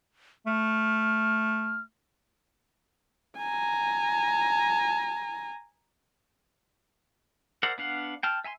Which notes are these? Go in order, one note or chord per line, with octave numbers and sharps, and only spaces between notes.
A3 F6
G#5 A#5
A#4 C5 D5 E5 F#5
B3 D4 F5 F#5
G5 A5 F6
E5 G#5 A5 C6